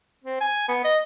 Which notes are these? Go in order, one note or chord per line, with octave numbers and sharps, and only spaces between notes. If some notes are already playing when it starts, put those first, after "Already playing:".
C4
G#5
B3
D#5